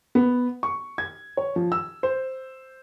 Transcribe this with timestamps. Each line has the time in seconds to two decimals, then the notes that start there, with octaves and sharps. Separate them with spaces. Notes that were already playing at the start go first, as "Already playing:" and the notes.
0.15 B3
0.63 C#6
0.98 G#6
1.37 C#5
1.56 F3
1.72 E6
2.03 C5